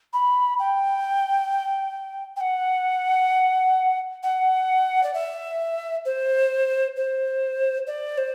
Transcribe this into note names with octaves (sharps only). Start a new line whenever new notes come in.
B5
G5
G5
F#5
F#5
D5
E5
C5
C5
D5
C5